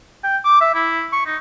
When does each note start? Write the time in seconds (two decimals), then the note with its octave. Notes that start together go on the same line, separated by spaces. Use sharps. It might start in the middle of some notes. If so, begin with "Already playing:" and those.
0.24 G5
0.45 D6
0.61 E5
0.75 E4
1.13 C#6
1.26 D#4